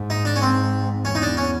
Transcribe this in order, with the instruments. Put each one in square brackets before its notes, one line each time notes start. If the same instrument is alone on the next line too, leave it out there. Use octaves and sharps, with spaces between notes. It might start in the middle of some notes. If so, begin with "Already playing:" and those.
Already playing: [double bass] G#2
[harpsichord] D#4
D4
C#4
C4
[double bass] E2 [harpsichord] C#4
[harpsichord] D#4
D4
C#4